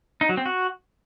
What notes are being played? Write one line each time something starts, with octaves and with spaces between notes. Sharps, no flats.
D#4
F#3
C4
F#4